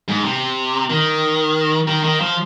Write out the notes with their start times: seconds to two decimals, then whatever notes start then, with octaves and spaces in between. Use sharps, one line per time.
0.08 G#2
0.24 C3
0.90 D#3
1.88 D#3
2.04 D#3
2.20 F3